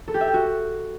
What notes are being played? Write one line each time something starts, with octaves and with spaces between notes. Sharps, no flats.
A4
G4
E5
G5
F#4